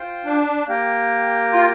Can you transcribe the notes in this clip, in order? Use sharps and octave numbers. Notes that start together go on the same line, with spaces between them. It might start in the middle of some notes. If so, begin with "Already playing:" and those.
Already playing: F4 C5 G5
D4
A#3 G4 A#4 G5
F4